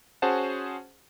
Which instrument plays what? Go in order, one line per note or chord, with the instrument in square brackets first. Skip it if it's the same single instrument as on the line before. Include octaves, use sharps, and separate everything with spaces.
[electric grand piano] C#4 F#4 G#4 C5 F#5 A5